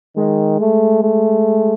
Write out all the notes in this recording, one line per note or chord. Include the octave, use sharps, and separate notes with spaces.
D#3 G#3
A3
A3